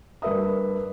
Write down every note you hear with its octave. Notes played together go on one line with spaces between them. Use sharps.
G2 A#4 B4 E5 D#6